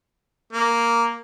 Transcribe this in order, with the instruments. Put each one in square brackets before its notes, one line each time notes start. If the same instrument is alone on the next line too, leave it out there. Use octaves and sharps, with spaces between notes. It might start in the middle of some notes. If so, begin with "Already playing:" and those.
[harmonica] A#3